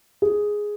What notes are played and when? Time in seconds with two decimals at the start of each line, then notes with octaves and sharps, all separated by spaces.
0.22 G#4